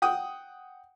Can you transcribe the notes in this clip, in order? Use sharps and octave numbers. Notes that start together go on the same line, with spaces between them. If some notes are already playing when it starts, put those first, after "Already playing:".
F#5 G5 D#6